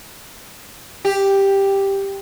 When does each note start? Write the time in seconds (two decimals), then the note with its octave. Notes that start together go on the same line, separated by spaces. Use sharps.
1.05 G4